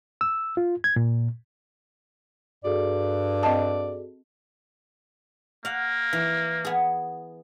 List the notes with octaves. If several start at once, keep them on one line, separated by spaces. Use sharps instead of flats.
E6
F4
G#6
A#2
G2 F#4 G#4 A4 D5
C4 D#5 A5
A#3 F5 F#5
E3
B3 G#4